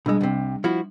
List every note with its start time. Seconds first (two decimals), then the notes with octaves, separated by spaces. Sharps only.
0.06 B1 G3 G#3 D4
0.21 C2 C3
0.64 F3 E4 F#4